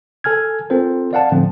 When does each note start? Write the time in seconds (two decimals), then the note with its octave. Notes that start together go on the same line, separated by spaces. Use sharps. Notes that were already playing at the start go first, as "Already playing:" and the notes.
0.24 A4 G#5 F6 G#6
0.70 C4 F4 A4 A#4 C5
1.13 D5 F5 F#5 A5
1.31 A2 D3 F3 C4